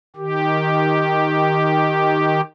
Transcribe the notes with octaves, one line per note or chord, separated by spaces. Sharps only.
D#3 G4